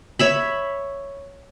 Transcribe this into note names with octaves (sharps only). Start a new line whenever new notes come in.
C#5 E5 B5